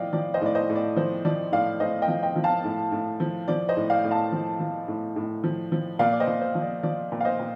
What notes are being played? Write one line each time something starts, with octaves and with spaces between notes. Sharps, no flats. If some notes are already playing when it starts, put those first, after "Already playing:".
Already playing: A2 F3 D5 D#5 F5 G5
F3 D5
C5 D#5
A2 D5
C5 D#5
A2
D5
F3 C5
F3 D5
A2 D5 F5
A2 C5 D#5
D#5 G5
F3
D#5 G5
F3
F5 A5
A2
A2
F3
F3 D5
C5 D#5
A2
D5 F5
A2
F5 A5
F3
F3
A2
A2
F3
F3
A#2 D5 F5
D5
C5 D#5
A#2
C5
F3
D5
F3 D5
A#2
F5
C5 D#5
A#2